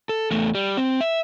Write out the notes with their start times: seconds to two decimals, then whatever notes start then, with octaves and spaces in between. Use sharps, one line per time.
0.09 A4
0.31 E2 A3
0.55 G3
0.77 C4
1.01 E5